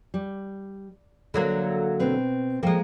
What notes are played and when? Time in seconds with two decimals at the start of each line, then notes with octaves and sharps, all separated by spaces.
0.14 G3
1.34 D3 F#3 A#3 E5
2.00 B2 C4 B4
2.63 F3 G#3 A#3 A4 G5